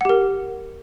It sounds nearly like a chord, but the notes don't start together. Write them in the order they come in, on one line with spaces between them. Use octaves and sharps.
F#5 G4 A#4